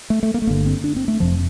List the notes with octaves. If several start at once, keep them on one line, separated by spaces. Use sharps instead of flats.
A3
A3
A#3
A3
G1 G2 D3 A#3
C4
D4
C4
A3
F1 F2 C3 F3